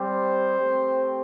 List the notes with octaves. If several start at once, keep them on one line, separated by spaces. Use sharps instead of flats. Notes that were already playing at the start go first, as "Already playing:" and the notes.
Already playing: G3 C4 G4 C5
A3 C4 G4